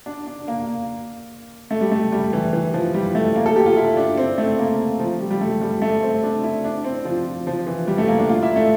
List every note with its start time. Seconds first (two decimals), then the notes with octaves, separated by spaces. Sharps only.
0.06 D4
0.27 D4
0.48 A#3
1.71 A3
1.81 G3
1.92 A3
2.12 G3
2.33 E3
2.53 E3
2.74 F3
2.94 G3
3.15 A3
3.36 A#3
3.46 A4
3.56 G4
3.66 F4
3.76 E4
3.97 D4
4.17 C4
4.38 A3
4.59 A#3
5.00 F3
5.20 G3
5.31 G3
5.41 A3
5.61 G3
5.82 A3
6.02 C4
6.23 D4
6.44 E4
6.64 D4
6.84 C4
7.05 F3
7.47 F3
7.67 E3
7.87 G3
7.98 A3
8.08 A#3
8.18 D4
8.29 F4
8.43 E4
8.56 A3